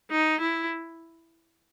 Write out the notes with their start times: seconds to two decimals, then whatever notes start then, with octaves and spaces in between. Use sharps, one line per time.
0.11 D#4
0.40 E4